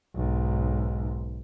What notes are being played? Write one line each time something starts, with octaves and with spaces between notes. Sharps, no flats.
B1 G#2